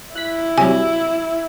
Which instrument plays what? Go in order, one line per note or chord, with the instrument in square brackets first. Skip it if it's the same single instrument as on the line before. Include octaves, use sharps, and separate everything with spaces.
[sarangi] E4 [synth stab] F#6 B6
[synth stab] C3 F#3 G3 [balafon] G#5